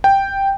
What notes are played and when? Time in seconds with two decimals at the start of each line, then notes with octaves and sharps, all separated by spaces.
0.04 G5